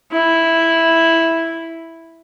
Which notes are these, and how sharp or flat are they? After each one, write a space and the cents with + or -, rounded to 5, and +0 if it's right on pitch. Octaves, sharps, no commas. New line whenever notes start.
E4 -5